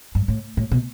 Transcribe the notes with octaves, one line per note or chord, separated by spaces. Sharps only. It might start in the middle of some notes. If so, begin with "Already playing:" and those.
G2
A2
A2
B2